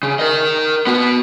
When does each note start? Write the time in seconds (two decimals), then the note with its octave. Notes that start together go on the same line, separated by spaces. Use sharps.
0.03 C#3
0.19 A#4 D#5
0.87 B3 F#4